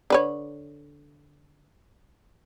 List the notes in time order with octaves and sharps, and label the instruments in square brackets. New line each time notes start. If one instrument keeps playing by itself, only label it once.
[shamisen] D3 B4 C#5